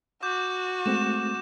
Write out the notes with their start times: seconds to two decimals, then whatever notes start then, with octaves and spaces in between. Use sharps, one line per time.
0.23 F#4 D6 G6
0.86 G#3 A3 C4 E7